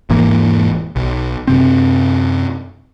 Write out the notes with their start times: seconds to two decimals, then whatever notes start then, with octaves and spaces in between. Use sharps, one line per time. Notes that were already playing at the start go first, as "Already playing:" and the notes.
0.10 E1 G#2 E3 A#3
0.96 B1
1.47 F#2 C3 C4